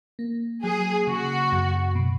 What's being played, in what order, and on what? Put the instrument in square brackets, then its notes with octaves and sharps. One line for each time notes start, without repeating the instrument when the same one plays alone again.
[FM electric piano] A#3
[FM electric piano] F#3 [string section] G#4
[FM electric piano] C#3 [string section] F#4
[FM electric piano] F#2
B2